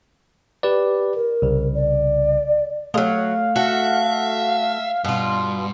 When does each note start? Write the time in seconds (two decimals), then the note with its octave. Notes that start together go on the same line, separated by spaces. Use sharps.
0.63 G4 B4 D5
1.15 A#4
1.42 C2 C#3
1.74 D5
2.94 F#3 G#3 A3 F5
3.56 F#4 A4 E5
5.04 G2 B2 F4